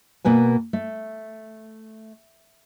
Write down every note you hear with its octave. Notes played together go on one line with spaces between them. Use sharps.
B2 A#3 B4 G#5
A3